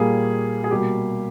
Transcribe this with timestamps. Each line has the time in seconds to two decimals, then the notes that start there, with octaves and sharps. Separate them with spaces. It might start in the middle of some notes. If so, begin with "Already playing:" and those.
Already playing: A#2 G3 A#3 G#4
0.64 G#4
0.71 B2 G3 A#3 G4